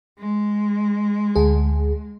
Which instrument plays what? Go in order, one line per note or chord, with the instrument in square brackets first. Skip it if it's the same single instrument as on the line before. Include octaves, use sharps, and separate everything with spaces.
[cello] G#3
[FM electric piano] D2 G#4